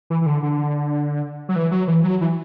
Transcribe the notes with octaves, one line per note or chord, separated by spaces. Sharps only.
E3
E3
D3
D3
F#3
E3
F#3
E3
F#3
E3